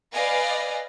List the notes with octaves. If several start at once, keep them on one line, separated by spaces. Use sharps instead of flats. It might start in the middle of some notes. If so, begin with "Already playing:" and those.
B4 D5 D#5 F5 G#5